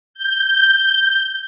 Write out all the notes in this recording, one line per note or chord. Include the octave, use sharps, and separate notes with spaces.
G6